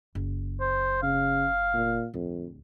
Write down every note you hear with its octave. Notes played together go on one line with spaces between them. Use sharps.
F#1
C5
C#3 F5
A#2
D1 F2